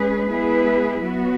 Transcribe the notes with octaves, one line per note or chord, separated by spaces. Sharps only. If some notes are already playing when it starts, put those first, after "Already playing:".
Already playing: G#3 C#4 G#4 B4
G#3 B3 E4 G#4 B4
F#3 B3 F#4